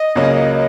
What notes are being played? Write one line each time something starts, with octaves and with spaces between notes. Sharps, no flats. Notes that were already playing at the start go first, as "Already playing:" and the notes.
Already playing: D#5
C#2 C#3 F#3 A#3 C#4